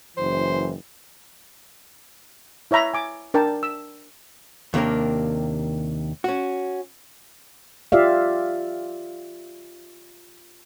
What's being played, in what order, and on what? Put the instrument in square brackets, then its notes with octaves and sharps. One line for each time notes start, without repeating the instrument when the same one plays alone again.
[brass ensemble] F#1 F#2 E3 [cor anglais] C5
[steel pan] E4 C#5 E5 A#5 B5
G#5 D6
D4 A#4 D5 G5 A5
E6
[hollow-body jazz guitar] D#2 C3 A#3 D4 A#4
C#4 F#4
[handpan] F4 G4 D5 E5 F5